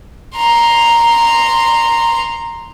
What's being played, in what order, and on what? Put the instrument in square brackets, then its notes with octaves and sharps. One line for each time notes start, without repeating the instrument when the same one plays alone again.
[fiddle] A#5 C6